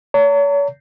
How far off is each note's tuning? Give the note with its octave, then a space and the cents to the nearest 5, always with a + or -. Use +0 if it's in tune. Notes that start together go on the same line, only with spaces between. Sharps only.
C#5 +40 A#5 -40